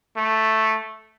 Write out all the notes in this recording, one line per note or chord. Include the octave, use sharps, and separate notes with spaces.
A3